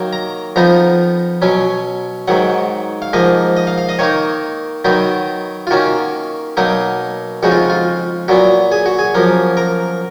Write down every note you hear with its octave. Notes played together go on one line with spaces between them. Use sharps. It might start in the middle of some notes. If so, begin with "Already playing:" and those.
Already playing: D#3 F#3 A#3
A#5
F2 F3 B3 D#4 A#5
B2 F#3 C#4
G#2 D#3 F#3 F#5
F5
G#2 F3 A#3 D#5
D#5
F5
F5
D#5
D#3 A#3 D#4 C#5
D#3 F#3 B3 D#4
F4
D#3 A#3 C#4 F#4
B2 F#3 A#3 D#4
F2 C#3 G#3 D#4 F#4
F4
F4
A#2 F#3 B3 F#4
G#4
F#4
G#4
F#2 F3 A#3
A#4